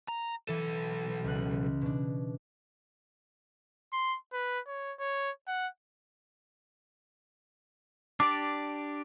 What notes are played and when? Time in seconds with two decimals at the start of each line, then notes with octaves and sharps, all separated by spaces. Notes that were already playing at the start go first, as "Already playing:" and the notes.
0.08 A#5
0.49 B1 E3 A4
1.24 C#2 F#6
1.81 B2 D4
3.93 C6
4.33 B4
4.67 C#5
4.99 C#5
5.47 F#5
8.20 D4 G4 D5 D6